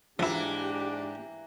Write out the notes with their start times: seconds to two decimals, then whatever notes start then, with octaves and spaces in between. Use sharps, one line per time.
0.19 G#2 E3 F3 A#3 D4 E4 G4